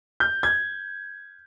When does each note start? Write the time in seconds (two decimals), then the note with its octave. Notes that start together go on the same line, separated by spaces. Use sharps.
0.20 G6
0.43 G#6